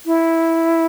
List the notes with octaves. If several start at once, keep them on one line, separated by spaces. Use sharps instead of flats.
E4